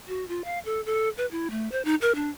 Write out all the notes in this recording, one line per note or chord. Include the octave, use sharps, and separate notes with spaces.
F#4
F4
F5
A4
A4
B4
E4
A3
C5
D#4
A#4
D4